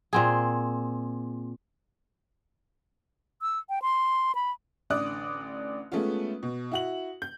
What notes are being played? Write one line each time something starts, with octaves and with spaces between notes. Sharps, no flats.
A#2 C4 G#4
E6
G5
C6
B5
A1 D3 D5 D#6 F#6
G#3 A3 B3 C#4 F4
B2
E4 F#4 F#7
G6